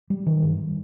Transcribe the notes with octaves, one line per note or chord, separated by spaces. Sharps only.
G3
D#3
G2